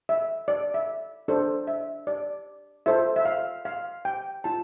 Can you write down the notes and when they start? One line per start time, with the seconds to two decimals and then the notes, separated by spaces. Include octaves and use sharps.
0.09 E5
0.48 D5
0.74 E5
1.28 D4 A4 C5
1.67 E5
2.07 D5
2.86 F4 A4 C5 E5
3.16 E5
3.25 F5
3.65 F5
4.05 G5
4.44 F4 A5